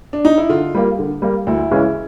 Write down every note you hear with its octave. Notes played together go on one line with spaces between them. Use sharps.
D4
D#4
E4
D3 F4
G3 A#3
D3
G3 A#3
D2 E4
C#3 E3 G#3 C#4